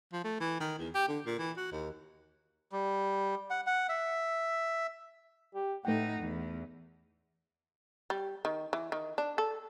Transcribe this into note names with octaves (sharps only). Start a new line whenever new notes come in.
F3
A3
E3
D#3
E2
G4
D3
A#2
E3
F#4
D#2
G3
F#5
F#5
E5
G4
A2 A3 D#4 F#5 G5
E2
G3
D#3
E3
D#3
D4
A4